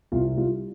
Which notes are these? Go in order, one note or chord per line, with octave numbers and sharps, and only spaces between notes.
C2 F4
G3 F4